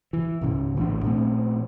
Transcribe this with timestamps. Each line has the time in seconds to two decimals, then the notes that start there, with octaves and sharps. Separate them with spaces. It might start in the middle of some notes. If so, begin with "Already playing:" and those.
0.13 E3
0.41 C#2 G#2 C#3
0.77 A1 E3 C4 D4
1.03 A#2 F3 A3 C4